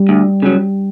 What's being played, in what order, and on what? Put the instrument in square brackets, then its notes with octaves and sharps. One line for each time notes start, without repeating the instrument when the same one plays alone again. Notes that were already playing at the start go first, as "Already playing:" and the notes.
Already playing: [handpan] G3
[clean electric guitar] D2
C#3 F#3